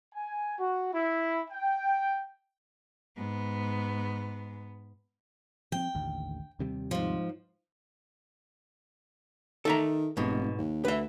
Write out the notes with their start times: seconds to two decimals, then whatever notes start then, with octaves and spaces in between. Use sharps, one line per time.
0.14 G#5
0.59 F#4
0.93 E4
1.51 G5
3.17 G#2 B3
5.72 F3 C4 G5
5.95 A1 D#2 D3
6.59 D#2 C3 G3
6.91 G#2 F3
9.65 D#3 A4 E5 A#5
10.17 F1 G#2 B2
10.58 D#2
10.85 D2 B4 E5